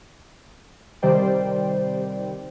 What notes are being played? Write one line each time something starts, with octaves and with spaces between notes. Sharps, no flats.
C3 D#3 G3 C5 D5 G5